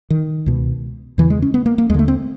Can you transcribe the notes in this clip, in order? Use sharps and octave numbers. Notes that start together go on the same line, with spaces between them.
D#3
C#2 B2
E2 C#3 E3
G#3
C#4
B3
A#3
A#3
D#2 D3 G#3 A3
C4